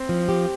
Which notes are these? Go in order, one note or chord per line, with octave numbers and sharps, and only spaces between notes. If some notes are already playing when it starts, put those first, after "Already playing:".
Already playing: C4
F3
G4